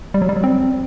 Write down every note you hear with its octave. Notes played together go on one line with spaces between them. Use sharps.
G3
F#3
G3
F#3
C4